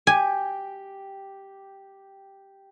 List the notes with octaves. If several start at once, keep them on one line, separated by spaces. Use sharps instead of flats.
G4 G#5